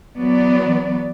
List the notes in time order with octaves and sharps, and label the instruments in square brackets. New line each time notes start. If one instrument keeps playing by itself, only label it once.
[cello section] E3 F#3 B3 D5